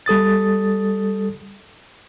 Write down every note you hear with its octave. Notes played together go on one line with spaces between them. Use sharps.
G3 A4 D#6 A6